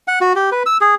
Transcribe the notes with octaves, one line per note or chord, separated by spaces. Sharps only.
F#5
F#4
G4
B4
E6
G#4